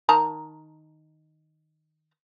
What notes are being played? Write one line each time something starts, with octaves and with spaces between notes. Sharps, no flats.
D#3 A5 A#5